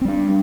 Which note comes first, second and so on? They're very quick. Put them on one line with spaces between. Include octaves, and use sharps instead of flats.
C4 G3 D4